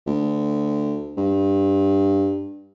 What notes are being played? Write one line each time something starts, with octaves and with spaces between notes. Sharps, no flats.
D2
G2